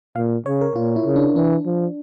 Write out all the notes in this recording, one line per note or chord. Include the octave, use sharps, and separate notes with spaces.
A#2 F5
C#3 C#5
A#4
A#2 F4
E4
C#3
D4
E3 D4
F3